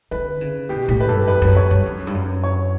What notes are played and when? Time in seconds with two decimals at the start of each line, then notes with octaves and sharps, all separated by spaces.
0.11 D3 B4
0.41 C#3
0.69 B2 G4
0.88 A2 G4
1.00 B4
1.08 G2 A4
1.28 F#2 B4
1.42 F#2
1.57 C#5
1.71 G2
1.85 F#2
2.07 G2
2.14 F#2
2.44 C#5